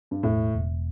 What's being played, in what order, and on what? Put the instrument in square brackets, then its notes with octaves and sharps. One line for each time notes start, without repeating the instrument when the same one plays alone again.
[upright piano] G2
[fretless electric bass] E1 [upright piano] A2
[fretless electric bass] E1